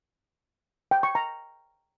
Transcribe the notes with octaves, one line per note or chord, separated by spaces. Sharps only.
G5
C#6
A#5